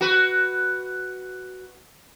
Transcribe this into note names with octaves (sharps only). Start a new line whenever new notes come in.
F#4 B4